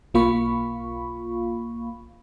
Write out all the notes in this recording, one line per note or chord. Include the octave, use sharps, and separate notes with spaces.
B1 A#3 F4 F5 B5 C#6